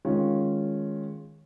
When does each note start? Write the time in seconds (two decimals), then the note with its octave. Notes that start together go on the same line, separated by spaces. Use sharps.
0.05 D#3 G#3 C#4 F4